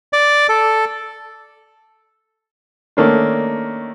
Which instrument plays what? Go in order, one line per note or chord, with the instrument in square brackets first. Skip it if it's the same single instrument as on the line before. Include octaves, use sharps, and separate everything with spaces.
[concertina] D5
A4
[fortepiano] D#3 A3 A#3 C#4 D4